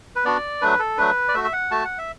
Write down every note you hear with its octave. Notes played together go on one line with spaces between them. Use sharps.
B4
B3 D4 F#4 D5
F#3 A3 D4 B4
A4
F#3 A3 D4 B4
D5
A3 F#4 E5
E5
F#5
A3 F#4 A5
F#5
E5